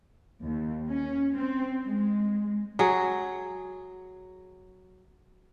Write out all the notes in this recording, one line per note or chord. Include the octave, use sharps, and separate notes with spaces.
D#2
C#4
C4
G#3
F#3 G#4